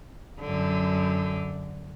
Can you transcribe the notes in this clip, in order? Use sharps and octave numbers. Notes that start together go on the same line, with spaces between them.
F#2 D3